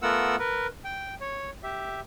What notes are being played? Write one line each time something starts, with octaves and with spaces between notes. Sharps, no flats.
A3 B3 F4 A#4 F#5 E6
A#4 B4
G5
C#5
G4 E5